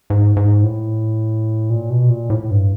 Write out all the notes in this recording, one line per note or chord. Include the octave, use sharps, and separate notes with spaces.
G#2
G#2
A2
A#2
B2
A#2
A2
G2